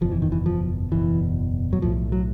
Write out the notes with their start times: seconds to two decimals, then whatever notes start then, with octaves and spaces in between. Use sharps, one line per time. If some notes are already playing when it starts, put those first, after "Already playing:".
0.01 F#1 E2 B2 F3
0.12 E3
0.22 D#3
0.32 E3
0.46 F3
0.92 F#1 E2 B2 E3
1.73 F#3
1.82 B1 A2 F3
2.12 F#3